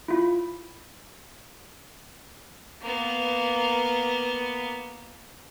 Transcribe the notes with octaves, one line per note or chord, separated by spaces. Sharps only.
E4 F4 B5
A#3 B3